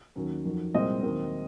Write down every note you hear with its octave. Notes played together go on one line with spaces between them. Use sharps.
D#2 D#3 F#3 C#4
F2 D#3 F#3
C2 A#2 G#3 C4 D#5
D#2 D#3 F#3 C4